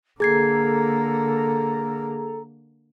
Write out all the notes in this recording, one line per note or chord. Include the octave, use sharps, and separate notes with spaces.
D3 A#3 G#4 A4 A#5 G#6 C7